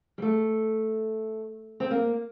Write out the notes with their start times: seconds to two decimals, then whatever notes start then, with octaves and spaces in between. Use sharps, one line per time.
0.18 G3
0.22 A3
1.80 C4
1.91 A#3